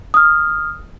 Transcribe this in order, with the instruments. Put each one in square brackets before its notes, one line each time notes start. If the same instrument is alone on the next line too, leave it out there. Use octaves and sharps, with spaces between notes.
[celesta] D#6 F6